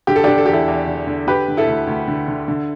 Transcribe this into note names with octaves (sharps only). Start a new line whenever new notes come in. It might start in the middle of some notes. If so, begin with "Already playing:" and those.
D3 G4
A4
D3 D4 G4
A4
E2 G4
E4 A4
E2
D3
D3
D3 G4 B4
D3
E4 A4
D2
D2
D3
D3
D3